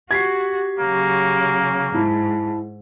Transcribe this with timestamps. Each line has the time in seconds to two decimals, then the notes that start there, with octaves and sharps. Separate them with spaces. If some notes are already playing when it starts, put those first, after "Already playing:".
0.11 F#4 G4 G#6 B6 C7
0.80 C#3 F#3 A#3
1.94 G#2 E4 A5